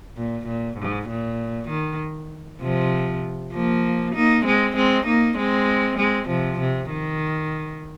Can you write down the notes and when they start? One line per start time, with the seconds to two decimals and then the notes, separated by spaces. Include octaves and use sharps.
0.17 A#2
0.47 A#2
0.78 G#2
1.09 A#2
1.69 D#3
2.61 C3 F3
3.53 F3 A#3
4.15 A#3 D#4
4.45 G#3 C4
4.76 G#3 C4
5.06 A#3 D#4
5.37 G#3 C4
5.98 G#3 C4
6.28 C3 F3
6.59 C3
6.90 D#3